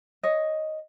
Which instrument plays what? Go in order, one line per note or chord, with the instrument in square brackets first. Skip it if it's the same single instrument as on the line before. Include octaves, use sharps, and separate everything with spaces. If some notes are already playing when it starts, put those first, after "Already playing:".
[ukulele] C#5 D#5